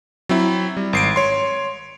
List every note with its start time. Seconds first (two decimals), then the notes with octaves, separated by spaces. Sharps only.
0.29 F#3 C4 E4
0.77 G3
0.93 G#1 C7 D7
1.16 C#5 C6